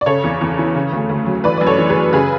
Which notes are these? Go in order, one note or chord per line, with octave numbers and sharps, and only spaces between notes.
D5
C#3 A4 C#5
E2
E2
E3
C#3
D2
D2
F#3
E3 B4 D5
F#2 D5
A4 C#5
E3
G#4 B4
F#2
C#3 G#4 B4